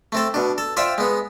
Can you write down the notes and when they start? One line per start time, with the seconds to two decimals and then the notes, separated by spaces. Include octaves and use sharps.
0.12 A3 C4 A4
0.34 B2 D4
0.58 A4
0.77 F4 C5 D5 E5 F5 G5
0.98 G#3 B3